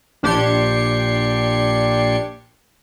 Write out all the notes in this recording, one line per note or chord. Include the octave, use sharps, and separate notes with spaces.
A#1 D4 G4 C6 G#6 C#7